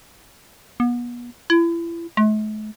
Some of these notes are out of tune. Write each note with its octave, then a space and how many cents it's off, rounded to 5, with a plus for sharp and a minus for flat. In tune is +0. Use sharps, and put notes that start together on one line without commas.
B3 -35
E4 +35
A3 -45